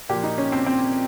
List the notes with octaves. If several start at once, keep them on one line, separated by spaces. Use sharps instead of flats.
A#2 F3 G4
D#4
C#4
C4
C4